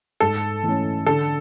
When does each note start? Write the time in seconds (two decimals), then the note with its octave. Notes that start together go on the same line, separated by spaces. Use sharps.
0.20 G#2 A4
0.63 E3 A3 C#4
1.06 D3 A4